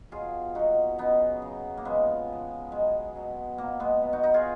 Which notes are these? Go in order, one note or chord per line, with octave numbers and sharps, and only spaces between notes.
B2 F#3 F4 G#4
B2 F#3 D#4 F#4
C#3 F#3 B3 D#4
C#3 F#3
A#3
C#3 F3 G#3 B3
C#3 F3
B2 F#3 G#3
B2 F#3
B2 F#3 A#3
G#3 B3
B2 F#3
D#4 F#4
D#4 F#4
F4 G#4